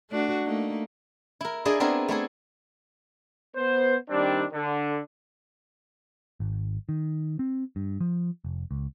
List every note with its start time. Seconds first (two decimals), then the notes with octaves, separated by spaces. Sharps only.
0.11 A3 D4 F#4
0.44 A3 A#3 D#4
1.41 E4 A#4
1.65 D4 E4 G#4 D5 D#5
1.80 B3 C4 D4 E4 G#4 A#4
2.08 A3 D4 E4 G#4
3.55 B3 C5
4.10 D#3 G3 C4 D4
4.53 D3
6.40 G#1
6.89 D#3
7.39 C4
7.76 G2
8.00 F3
8.45 F1
8.71 C#2